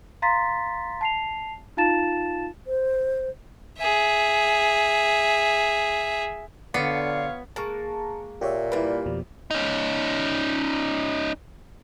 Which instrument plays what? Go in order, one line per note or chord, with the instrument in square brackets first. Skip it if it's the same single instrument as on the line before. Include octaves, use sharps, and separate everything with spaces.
[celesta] F5 A#5 C6 A6 B6
A5 C7 F7
D#4 F4 F5 A5 A6 E7
[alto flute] C5
[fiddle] G#4 E5
[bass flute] D3 [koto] B3 [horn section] F4 C#5 F5 [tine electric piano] D5 C7 C#7
[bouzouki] G#3 A#3 [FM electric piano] A5 A#5 C#6
[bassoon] A#2 [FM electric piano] G4 C#5 E5
[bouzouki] G3 A#3 [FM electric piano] E4 B4
[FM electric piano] F2 B2 F3
[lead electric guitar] C#4 D#4